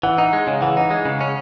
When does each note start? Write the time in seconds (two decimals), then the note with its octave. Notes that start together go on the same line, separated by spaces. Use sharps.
0.03 E3 F#5
0.18 D#4
0.33 G#3
0.47 C#3
0.62 E3 F#5
0.77 D#4
0.91 G#3
1.05 C#3
1.21 C#4